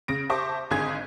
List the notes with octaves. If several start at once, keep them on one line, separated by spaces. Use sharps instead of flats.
C#3 A#6 D7
G4 C5 E5 A5 C#6 D6
G#1 G#2 D3 G#4 G#6